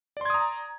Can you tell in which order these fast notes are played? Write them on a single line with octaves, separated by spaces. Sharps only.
D5 C6 G#6 D#6 A#5